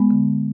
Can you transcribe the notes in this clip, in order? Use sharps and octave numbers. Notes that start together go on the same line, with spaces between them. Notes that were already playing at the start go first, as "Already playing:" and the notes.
Already playing: G#3 B3
D3